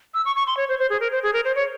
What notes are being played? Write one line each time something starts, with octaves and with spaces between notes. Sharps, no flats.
E6
C#6
C#6
C6
C#5
C5
C5
G#4
A#4
C5
G#4
A#4
C5
C#5